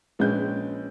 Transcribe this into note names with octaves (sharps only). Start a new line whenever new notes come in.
A#1 G#3 C#4 B4 G6